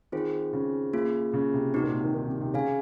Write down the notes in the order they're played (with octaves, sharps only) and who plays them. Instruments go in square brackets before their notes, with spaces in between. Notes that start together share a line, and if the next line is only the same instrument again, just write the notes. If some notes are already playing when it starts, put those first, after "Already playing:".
[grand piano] D#3 [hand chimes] C4 F4 G#4 C5
[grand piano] C#3
[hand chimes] A#3 F4 G#4
[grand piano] C#3
C3
[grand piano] C3 [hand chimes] C4 D#4 F#4
[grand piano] A#2
C3
D#3
D#3
C3
C3
[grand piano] C#3 [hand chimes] G#4 C#5 F5 G#5